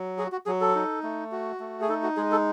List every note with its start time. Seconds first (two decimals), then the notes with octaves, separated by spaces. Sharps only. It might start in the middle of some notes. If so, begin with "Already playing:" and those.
Already playing: F#3
0.18 F#4 G#4
0.32 F#4
0.46 F#3 G#4
0.61 A4
0.75 D#4
1.03 A3
1.32 F#4
1.60 A3
1.81 G#4
1.89 D#4 A4
2.03 F#4
2.17 G#3 G#4
2.32 A4